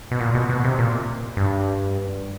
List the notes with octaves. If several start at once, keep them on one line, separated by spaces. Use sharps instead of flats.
B2
A#2
B2
B2
C3
A#2
G2